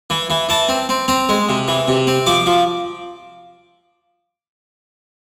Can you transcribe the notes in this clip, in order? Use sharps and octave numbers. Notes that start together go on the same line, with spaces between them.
E3
E3
E3 A5
C4
C4
C4 A#5
G#3
C3
E3
C3
C4
F3 D6
F3